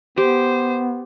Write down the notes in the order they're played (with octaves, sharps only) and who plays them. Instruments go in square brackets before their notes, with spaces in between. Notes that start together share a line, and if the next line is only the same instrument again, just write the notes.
[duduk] B3 [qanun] G4 [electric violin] C5